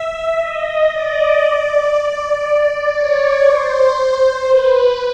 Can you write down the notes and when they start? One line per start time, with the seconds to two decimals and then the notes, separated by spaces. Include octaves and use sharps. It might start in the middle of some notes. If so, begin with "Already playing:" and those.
Already playing: E5
0.37 D#5
0.89 D5
2.94 C#5
3.46 C5
4.48 B4